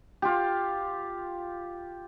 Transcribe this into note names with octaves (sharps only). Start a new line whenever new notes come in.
F4 G4